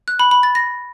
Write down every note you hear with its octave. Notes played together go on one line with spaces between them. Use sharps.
F#6
B5
B5
A6
A#6